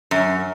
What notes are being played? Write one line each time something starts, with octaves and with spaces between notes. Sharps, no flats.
F#2